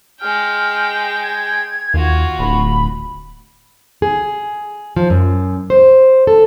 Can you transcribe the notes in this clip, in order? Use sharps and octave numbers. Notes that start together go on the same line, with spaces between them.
G#3 G5 F6
G#6
D#2 F4 F#4
D1 B5
G#4
F3
F#2
C5
A4